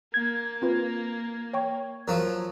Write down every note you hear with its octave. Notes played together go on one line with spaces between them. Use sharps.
A#3 G#6
C4 F4 B4
C#5 G5 C#6
F3 F#3 A#4